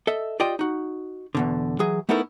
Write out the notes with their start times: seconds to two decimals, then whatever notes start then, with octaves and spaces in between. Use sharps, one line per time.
0.07 A4 D#5 E5
0.40 F4 G4 D5 D#5 G5
0.59 D#4 F#4
1.35 E2 B2 D3
1.79 E3 F#3 G#4
2.09 A3 B3 D#4 E4 A4 A#4